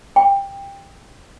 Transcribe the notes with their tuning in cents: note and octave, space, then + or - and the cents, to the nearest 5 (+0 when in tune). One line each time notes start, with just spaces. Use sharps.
G5 +15